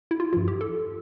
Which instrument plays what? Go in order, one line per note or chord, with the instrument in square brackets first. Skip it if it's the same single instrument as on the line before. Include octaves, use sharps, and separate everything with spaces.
[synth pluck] E4
F4
G2 F3 F4
G4
A4